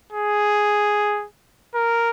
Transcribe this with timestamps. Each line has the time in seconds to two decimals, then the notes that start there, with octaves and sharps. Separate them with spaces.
0.12 G#4
1.75 A#4